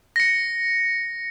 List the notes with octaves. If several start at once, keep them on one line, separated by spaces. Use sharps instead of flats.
A#6 C#7